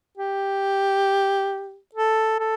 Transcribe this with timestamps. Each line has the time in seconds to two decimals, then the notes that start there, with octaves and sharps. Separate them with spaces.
0.17 G4
1.95 A4
2.39 A4